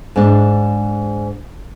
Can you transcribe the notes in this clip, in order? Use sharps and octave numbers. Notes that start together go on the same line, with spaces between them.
G#2 D4